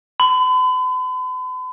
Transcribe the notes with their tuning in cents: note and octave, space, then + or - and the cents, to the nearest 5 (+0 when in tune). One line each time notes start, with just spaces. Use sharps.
B5 +45